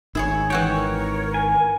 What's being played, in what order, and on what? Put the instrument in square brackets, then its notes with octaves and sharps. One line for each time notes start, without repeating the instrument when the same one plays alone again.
[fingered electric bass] G#1 D#3 [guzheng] E4 G#4 C#5
[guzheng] E3 F#4 G5 [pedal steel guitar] C#5
[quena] A#4
[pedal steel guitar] G#5